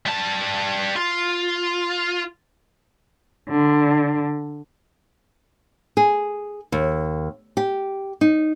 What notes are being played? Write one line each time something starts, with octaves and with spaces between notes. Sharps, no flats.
G3 A5
F4
D3
G#4
D#2
G4
D#4